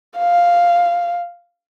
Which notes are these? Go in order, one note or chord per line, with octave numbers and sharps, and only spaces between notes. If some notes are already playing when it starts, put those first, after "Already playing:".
F5